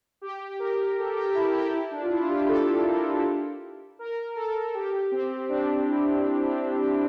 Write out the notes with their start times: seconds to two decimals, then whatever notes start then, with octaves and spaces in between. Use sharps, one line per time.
0.21 G4
0.59 A#4
0.97 A4
1.16 G4
1.35 E4
1.53 G4
1.72 E4
1.91 D4
2.03 F4
2.10 E4
2.24 F4
2.29 G4
2.41 G4
2.48 A4
2.86 A#4
3.99 A#4
4.36 A4
4.74 G4
5.12 C4
5.49 D4
5.87 E4